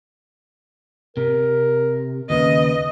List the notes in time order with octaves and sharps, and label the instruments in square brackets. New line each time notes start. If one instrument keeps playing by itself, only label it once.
[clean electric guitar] C3 [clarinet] A#4
[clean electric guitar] D#2 C#3 [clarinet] B4 [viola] D#5